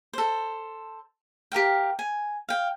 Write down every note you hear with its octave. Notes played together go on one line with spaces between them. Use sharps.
A4 C5
G4 A#4 F5 G5
G#5
F5 G5